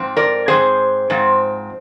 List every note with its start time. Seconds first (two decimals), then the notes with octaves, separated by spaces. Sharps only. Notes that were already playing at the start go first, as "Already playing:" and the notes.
Already playing: G#2 F3 C4
0.17 A#4 D5
0.48 G#2 F3 C4 G#4 C5
1.10 G#2 F3 C4